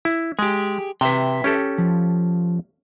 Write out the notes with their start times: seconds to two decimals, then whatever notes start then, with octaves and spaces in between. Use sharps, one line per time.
0.05 E4
0.39 G#3 G4 G#4
1.01 C3 B4 E5 G5
1.44 C#4 G4 A4
1.78 F3